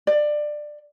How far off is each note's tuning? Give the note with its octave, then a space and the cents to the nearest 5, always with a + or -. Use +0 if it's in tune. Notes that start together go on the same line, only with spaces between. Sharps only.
D5 +20